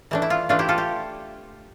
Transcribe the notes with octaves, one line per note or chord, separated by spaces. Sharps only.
E3 A3 D4 E4
E4
F4
E3 A3 D4 F4
E4 G4
F4 A4
G4